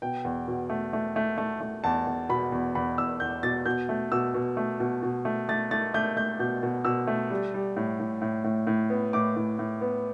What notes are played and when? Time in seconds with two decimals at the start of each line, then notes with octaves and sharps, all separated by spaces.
0.02 B2 G5
0.25 E2
0.48 B2
0.70 A3
0.93 A3
1.16 A3
1.38 A3
1.61 A3
1.84 E2 A5
2.06 E2
2.29 B2 B5
2.52 E2
2.75 E2 B5
2.98 E2 E6
3.20 E2 G6
3.43 B2 A6
3.66 B2 G6
3.89 A3
4.12 B2 E6
4.34 B2
4.57 A3
4.80 B2
5.03 B2
5.25 A3
5.49 A3 A6
5.71 A3 A6
5.94 A3 G6
6.17 A3 G6
6.39 B2 G6
6.63 B2
6.85 B2 E6
7.07 A3
7.31 G3
7.54 G3
7.77 A2
8.00 A2
8.22 A2
8.44 A2
8.67 A2
8.90 B3
9.13 A2 D6
9.36 A2
9.59 A2
9.81 B3